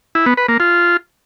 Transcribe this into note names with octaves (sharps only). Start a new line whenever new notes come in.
E4
B3
B4
A#3
F4